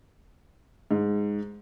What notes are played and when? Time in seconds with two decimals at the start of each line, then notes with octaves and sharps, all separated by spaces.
0.91 G#2